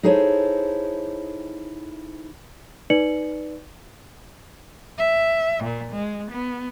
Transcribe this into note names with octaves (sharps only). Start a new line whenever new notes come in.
D#4 E4 G#4 A4 C5 C#5
D#4 B4 D5 C#7 F#7
E5
A#2
G#3
B3